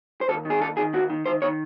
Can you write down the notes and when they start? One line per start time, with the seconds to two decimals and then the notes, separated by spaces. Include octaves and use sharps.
0.21 C5
0.29 D#2 A4
0.45 D#3 G#4
0.61 D#2 A4
0.77 D#3 G#4
0.93 D#2 F#4
1.10 D#3
1.26 D#3 C5
1.42 D#3 C#5